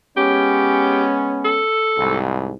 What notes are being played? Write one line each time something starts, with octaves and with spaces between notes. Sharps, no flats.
G#3 B3 C#4 G4
A4
C2 G#2